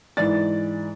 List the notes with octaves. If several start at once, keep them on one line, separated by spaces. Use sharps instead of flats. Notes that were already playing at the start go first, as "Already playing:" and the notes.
G#2 E3 E4 D5 A6